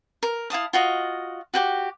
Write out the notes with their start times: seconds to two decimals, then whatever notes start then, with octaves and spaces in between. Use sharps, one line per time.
0.23 A#4
0.50 E4 F5 A5 D#6
0.73 F4 F#4 D#5
1.54 F#4 G4 G5 D6